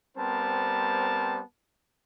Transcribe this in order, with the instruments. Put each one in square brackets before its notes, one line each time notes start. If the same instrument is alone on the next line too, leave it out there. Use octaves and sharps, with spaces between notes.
[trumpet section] G3 B3 C4 A#4 C5 A5